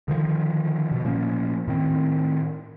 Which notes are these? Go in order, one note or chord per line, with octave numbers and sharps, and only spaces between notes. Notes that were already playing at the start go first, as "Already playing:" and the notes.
D3 D#3 F3
B2
A#2 F3 A#3 C#4
A2 D#3 C4